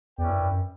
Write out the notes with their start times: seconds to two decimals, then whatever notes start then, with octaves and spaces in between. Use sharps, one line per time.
0.18 E2 C#4 E4 B4 D5 G5
0.30 F#2
0.40 F#2
0.51 F#2